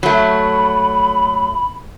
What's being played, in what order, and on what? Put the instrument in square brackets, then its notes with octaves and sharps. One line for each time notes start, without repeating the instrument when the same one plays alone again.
[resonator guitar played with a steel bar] F#3 A3 [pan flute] B5